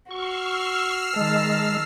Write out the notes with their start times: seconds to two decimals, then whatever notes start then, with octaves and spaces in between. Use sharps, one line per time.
0.11 F#4 C#6 E6 F6 C7
1.16 D#3 G#3 A5